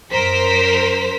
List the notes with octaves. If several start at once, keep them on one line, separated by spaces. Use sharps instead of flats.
F#2 A#4 C5 B6